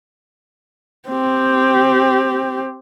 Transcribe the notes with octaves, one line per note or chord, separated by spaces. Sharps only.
C4 G4